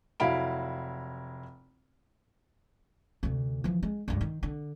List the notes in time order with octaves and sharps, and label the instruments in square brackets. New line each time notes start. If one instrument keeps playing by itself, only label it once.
[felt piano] F1 F#3 E4 F5 B5 D7
[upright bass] D2 C3
E3 F3
G#3
C#2 G2
D#3
D3